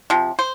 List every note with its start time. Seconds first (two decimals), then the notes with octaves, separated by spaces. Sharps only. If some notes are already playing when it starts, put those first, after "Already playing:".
0.10 C3 F3
0.39 C5